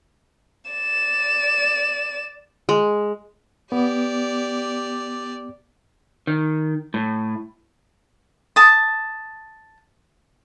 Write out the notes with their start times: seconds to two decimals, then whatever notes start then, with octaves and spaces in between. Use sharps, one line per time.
0.71 D5 E7
2.69 G#3
3.72 B3 G4 D5
6.27 D#3
6.94 A2
8.56 A5 D#6